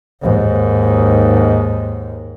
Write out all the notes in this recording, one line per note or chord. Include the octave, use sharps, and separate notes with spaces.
D#2 G#2